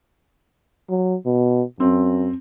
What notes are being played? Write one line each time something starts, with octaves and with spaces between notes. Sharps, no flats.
F#3
B2
F#2 C4